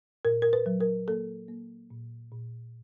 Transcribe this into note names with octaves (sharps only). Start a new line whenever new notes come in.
A#2 A#4
A#4
B4
F#3
A#4
A#3 A4
A#3
A#2
A#2